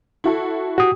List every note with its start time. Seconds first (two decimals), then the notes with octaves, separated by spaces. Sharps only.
0.24 E4 F#4 A4
0.78 F#4 G4 D#6